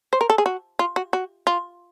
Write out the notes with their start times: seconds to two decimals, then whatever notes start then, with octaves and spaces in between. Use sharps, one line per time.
0.13 C5
0.21 A#4
0.30 A4
0.38 G#4
0.46 F#4
0.79 F4
0.96 F#4
1.13 F#4
1.47 F4